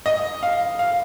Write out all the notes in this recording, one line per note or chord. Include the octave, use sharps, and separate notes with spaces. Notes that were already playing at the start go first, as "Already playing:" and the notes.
D#5
F5
F5